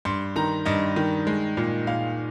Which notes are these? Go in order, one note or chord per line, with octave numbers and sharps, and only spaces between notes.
G2 C6
D#3 A#5
G2 D#5
D#3
G#3
A#2
A#2 F5